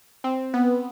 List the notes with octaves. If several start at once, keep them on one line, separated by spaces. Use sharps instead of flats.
C4
B3